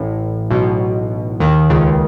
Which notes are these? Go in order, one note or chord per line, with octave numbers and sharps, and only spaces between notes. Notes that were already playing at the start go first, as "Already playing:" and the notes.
Already playing: A1 A2
B1 B2
D#2 D#3
C#2 C#3